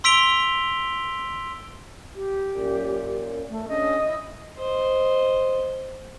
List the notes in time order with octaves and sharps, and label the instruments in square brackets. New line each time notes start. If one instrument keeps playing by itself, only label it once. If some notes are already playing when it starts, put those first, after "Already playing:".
[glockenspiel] C6 E6 B6 D7 F7 G7
[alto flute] G4
[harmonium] F#2 A#2
[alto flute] A3
[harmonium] C#4 D4 G#4 [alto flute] D#5
[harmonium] E4 E5
[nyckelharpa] C5 D#5